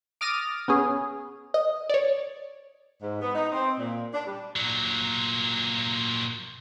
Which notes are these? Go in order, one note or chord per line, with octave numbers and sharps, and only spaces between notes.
D6 D#6 F6 A6 A#6 D#7
B3 C#4 G#4
D#5
C#5 D5
G#2
B3
D#4
C4
A#2
D4
G3
A#2 F#3